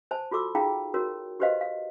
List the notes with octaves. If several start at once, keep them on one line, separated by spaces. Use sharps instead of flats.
C5 G#5 A5
F4 F#4 A4 D6 E6
D#4 F4 G#4 F5 G5 A#5
F#4 A#4 C#5
F#4 G4 B4 C5 D#5 F5
F5